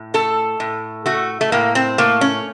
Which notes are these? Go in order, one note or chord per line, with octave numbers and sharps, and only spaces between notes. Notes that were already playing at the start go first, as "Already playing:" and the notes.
Already playing: A2
A3 A4
A2
A3 F#4
A3
A2 A#3
C4
A3 A#3
C#4